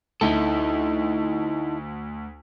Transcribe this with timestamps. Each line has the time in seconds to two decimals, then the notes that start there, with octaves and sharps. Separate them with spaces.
0.21 D2 D#4 E4 A4